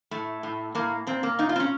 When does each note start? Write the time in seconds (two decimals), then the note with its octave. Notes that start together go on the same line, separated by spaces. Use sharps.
0.11 A2 A3
0.43 A2
0.75 A2 A#3
1.07 A#2 C4
1.23 A#3
1.39 A#2 D#4
1.49 F4
1.56 C4
1.60 C#4